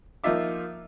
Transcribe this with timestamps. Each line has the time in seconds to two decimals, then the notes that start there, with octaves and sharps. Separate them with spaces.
0.24 F3 A#3 D#4 F4 E5 D6